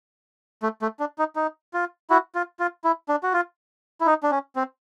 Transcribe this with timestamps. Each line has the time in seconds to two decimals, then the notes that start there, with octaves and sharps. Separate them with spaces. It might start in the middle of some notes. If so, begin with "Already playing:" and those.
0.63 A3
0.82 A3
1.00 D4
1.19 D#4
1.36 D#4
1.74 F4
2.10 E4 F#4
2.35 F4
2.59 F4
2.84 E4
3.09 D4
3.23 F#4
3.33 F4
4.01 E4
4.07 D#4
4.23 D4
4.31 C#4
4.56 C4